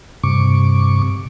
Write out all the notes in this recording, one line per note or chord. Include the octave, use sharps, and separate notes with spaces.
G2 C3 C#6 D6